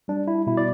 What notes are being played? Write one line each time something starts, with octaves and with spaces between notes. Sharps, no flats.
G3 D4
E4
B2 E4
D5